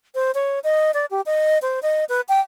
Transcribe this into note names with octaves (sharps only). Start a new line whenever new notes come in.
C5
C#5
D#5
D5
G4
D#5
C5
D#5
B4
G5